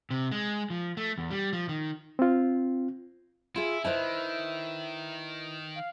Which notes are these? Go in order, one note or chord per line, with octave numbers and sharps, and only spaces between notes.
C3
G#3
F3
A3
E2
G3
F3
D#3
C4 F4
E4 F4 G#4 E5
D#3 E4 B4 C5 D#5 A5
F5